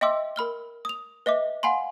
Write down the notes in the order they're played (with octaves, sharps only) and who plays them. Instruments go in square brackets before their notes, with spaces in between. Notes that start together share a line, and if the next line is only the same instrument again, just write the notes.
[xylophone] D#5 E5 G5 C6 D6 E6
A#4 B5 F6 G7
D#6 F7
B4 D#5 E5 D6
F5 F#5 G#5 B5 C6